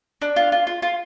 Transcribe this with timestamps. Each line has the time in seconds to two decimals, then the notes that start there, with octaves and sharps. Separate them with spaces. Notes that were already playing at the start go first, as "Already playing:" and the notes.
0.22 D4
0.36 F4
0.52 F4
0.67 F4
0.82 F4